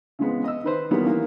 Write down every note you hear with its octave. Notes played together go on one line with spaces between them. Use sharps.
C#3 E3 G#3 B3 C4
D#5 E6
D#3 B4 C5
D#3 E3 F#3 G3 A#3 B3
D#3 E3 A#3